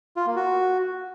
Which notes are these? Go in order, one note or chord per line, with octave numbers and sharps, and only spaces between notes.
F4
A#3
F#4